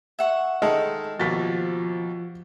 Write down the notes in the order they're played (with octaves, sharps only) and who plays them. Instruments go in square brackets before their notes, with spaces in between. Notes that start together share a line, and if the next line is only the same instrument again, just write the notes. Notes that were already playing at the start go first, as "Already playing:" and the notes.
[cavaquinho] E5 F#5 C#6
[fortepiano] D#3 G#3 A4 [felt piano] D#5
[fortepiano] D#2 B2 [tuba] F3 [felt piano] A6 B6